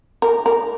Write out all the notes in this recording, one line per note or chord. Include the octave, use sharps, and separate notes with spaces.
A#4
A#4